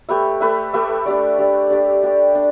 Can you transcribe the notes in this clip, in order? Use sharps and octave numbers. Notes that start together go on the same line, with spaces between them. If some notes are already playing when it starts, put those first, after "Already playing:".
A3 G4 B4 E5
A3 G4 B4 E5
A3 G4 B4 E5
D4 G4 D5
D4 G4 D5
D4 G4 D5
D4 G4 D5
D4